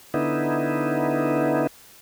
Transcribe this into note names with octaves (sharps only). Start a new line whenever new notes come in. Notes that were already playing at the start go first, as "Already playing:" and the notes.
D3 B3 D#4 E4